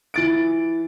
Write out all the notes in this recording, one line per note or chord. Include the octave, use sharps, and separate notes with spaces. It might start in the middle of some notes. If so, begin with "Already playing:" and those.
E3 A6 D7